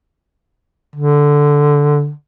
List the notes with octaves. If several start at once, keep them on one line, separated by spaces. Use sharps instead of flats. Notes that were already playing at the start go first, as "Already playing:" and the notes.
D3